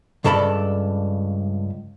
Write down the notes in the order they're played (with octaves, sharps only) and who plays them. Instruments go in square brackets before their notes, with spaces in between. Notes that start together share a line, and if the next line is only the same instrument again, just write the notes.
[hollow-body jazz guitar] C#2 G2 A4 D5 A5 B5